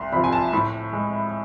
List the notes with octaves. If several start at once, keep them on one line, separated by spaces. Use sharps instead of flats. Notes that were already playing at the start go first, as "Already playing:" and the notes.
Already playing: C2 C6
C3 F3 B5
G#5
A5
A2 B5
G#3